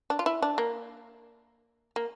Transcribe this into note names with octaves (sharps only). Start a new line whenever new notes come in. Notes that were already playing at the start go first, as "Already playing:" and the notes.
D4
F4
E4
D4
A#3
A#3